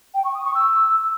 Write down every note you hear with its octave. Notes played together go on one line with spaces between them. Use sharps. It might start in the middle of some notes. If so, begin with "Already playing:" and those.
G5
C#6
D#6
C#6
E6